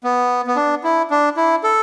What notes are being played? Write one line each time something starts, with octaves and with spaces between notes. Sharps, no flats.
B3
B3
D4
E4
D4
E4
A4